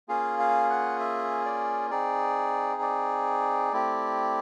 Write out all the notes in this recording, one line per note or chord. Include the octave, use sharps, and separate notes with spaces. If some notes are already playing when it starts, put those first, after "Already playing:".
A#3 C#4 F4 G#4 F5
F5
F#5
E5
D5
C4 D#4 G#4 D5
D5
A3 C4 E4 G4